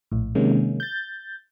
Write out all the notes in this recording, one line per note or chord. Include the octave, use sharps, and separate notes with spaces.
A#1 A2
C3 D#3 G#3 A#3 C#4
G6 A6